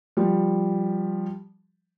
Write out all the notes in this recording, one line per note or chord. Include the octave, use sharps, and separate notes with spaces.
F3 G3